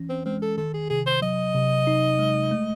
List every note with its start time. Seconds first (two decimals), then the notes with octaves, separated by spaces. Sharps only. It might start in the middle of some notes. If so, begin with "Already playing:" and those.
Already playing: E3 C#4
0.09 C4
0.26 G#3 C4
0.42 A4
0.58 D#3 A4
0.74 G#4
0.90 C3 G#4
1.06 C5
1.22 F#3 D#5
1.55 C3
1.87 D#4
2.19 G#3
2.51 A3